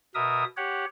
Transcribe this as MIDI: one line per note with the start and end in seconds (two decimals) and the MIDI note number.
0.15 0.44 47
0.15 0.44 70
0.15 0.44 76
0.15 0.44 87
0.57 0.85 67
0.57 0.85 73
0.57 0.85 78